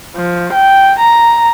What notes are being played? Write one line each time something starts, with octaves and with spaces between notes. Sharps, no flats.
F3
G5
A#5